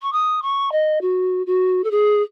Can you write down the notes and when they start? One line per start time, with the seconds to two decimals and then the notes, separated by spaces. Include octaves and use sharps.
0.02 C#6
0.12 D#6
0.42 C#6
0.72 D#5
1.01 F#4
1.46 F#4
1.84 A4
1.91 G#4